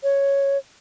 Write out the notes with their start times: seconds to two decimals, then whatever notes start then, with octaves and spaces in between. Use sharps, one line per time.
0.03 C#5